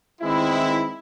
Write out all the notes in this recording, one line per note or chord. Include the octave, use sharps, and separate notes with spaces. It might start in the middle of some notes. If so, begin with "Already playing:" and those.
D#3 G#3 B3 C4 E4